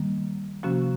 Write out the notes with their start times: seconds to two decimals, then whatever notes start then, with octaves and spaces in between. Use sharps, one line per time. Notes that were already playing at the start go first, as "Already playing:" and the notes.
Already playing: D#3 G3 A#3
0.63 C3 F3 A#3 C#4 F#4